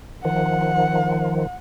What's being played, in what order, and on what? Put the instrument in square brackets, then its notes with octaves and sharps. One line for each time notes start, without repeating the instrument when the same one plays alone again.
[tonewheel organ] D#3 F3 [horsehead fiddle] F#5